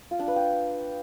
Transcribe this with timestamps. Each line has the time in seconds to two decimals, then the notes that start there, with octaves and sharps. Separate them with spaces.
0.11 F4
0.19 D4
0.28 B4
0.36 G5